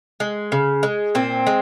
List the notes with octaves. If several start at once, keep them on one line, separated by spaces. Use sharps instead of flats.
G#3
C#3
G#3
A#2 C4
G#3